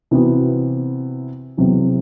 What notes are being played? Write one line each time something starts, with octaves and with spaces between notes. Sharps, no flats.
C3 E3 B3 F#4
E2 C3 F#3